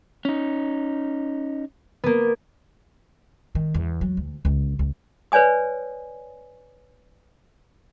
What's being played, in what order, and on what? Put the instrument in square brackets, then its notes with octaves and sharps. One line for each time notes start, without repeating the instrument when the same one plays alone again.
[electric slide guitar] C#4 D#4
[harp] A#3 B3
[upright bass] D#3
E2
F#3
D2
C#2
C#2
[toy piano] B4 C#5 D5 G#5 D#6